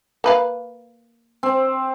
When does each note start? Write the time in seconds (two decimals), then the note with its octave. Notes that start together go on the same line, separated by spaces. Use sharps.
0.24 A#3 B4 F5
1.43 C4